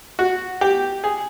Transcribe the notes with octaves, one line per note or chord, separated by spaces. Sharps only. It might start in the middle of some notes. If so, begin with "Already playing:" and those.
F#4
G4
G#4